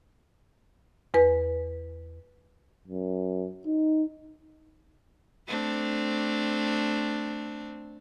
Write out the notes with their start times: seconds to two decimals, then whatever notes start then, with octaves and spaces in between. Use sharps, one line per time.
1.14 E2 B4
2.88 F#2
3.66 D#4
5.48 A3 C4 D4